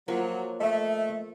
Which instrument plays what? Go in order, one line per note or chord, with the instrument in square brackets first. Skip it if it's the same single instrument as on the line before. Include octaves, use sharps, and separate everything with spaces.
[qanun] F3 A#3 [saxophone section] F#3
[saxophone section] A3 [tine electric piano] D#5 E5